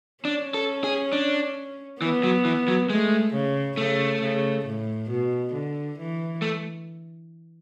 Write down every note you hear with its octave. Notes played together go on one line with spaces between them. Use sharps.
C#4 D4
A4
G#4
D4
E3 B3
F#3
E3
F#3
G#3 A3
C#3
C#3 A3
C#3
A2
B2
D3
E3
A3